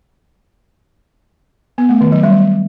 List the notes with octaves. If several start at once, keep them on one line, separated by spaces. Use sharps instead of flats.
B3
A3
D#3
F#3
G3